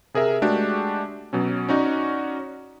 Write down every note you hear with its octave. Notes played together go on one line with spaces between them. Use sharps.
C3 G#4 A#4 E5
G#3 A3 D4 F#4 G4
B2 F#3 C#4
C#4 D#4 F#4 D5